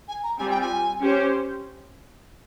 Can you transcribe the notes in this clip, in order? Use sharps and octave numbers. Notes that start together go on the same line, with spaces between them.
G#5
A#5
G3 C4 F4 G#5
G5
G#5
C#4 G4 C5